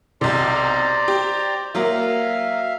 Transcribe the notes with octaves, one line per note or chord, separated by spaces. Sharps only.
B1 C3 C5 D5 A#5
G4
F#3 A#3 E5 F5